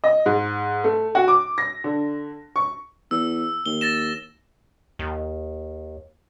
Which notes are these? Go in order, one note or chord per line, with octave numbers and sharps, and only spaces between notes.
D#5
G#2
A3
F#4
D6
A#6
D3
C#6
E2 E6
D#2 G7
A6 A#6 E7
D#2